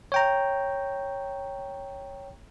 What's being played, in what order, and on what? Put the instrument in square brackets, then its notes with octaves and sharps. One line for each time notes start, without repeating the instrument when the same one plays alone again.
[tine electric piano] C#5 G5 A#5